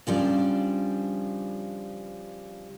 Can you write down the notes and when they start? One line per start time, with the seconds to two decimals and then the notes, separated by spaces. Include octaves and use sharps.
0.07 C#3 F3 G3 D4